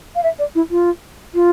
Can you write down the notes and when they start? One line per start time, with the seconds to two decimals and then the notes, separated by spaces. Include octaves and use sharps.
0.15 F5
0.23 E5
0.39 D5
0.55 E4
0.71 F4
1.34 F4